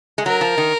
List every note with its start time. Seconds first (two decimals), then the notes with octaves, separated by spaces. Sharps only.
0.18 G#3
0.26 F#3 A#4
0.41 F3
0.58 D#3